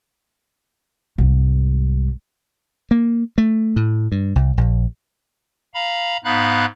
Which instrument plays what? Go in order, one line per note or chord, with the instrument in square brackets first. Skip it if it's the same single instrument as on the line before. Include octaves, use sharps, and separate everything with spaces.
[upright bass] C2 G#2
[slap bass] A#3
A3
A2
G2
C2
A#1
[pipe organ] F5 A#5 B5
G#2 B3 D#4 F5 B5 F#6